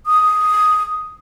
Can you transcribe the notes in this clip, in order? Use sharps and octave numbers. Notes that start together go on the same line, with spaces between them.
D#6